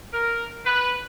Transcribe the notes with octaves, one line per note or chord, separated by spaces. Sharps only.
A#4
B4